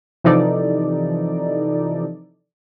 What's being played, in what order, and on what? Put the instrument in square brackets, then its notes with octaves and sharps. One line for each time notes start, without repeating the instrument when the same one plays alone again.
[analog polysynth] C3 E3 F3 D#4 A4 D5